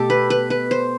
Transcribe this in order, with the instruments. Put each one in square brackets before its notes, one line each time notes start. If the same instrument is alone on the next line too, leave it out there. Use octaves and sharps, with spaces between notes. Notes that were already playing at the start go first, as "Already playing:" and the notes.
Already playing: [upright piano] B2 A3 [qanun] G4 A4
[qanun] B4
B4
B4
C5